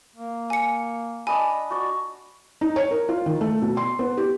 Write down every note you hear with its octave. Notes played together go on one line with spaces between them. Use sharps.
A#3
G#5 C#7
D4 D#5 G#5 B5
F#4 D5
D#4
C#5
A#4
F4
D#3
A3
B2
C6
B3
G4